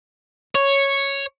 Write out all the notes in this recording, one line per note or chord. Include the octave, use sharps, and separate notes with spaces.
C#5